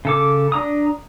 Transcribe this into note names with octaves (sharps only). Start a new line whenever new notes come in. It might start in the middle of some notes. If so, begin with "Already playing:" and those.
C#3 A4 D6
D4 A#5 D#6